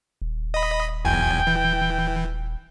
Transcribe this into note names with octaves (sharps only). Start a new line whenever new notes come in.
D#1
D#5 B5
B1 E2 G5 G#5
E3